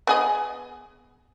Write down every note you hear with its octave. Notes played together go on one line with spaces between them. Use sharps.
B3 G#4 D#5